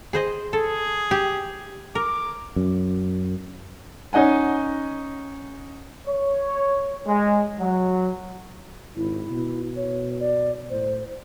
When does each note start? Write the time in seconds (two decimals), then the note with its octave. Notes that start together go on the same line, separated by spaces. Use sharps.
0.13 G#4 C5 D#5
0.53 G#4 A4
1.11 G4
1.95 A#4 D6
2.56 F#2
4.13 C#4 D#4 D#5 F#5 G#5
6.07 C#5
7.06 G#3
7.59 F#3
8.96 G#1 E4
9.31 B2
9.76 C#5
10.20 D5
10.70 A2 C5